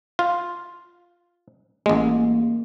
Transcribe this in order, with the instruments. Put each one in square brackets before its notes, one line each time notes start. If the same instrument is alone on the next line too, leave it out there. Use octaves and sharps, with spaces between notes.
[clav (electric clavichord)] F4
[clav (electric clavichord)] A1 G#3 [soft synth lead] A#3